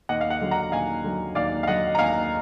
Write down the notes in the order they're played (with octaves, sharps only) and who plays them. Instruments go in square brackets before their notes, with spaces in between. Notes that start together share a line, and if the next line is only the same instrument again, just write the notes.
[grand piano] D#2 D#5 F#5
F5
D#5 F#5
D3 F#3
F#5 A#5
D#2 F5 G#5
D3 F#3
D#2 D5 F5
F5
D3 F#3 D#5 F#5
A#5
D#2 F5 G#5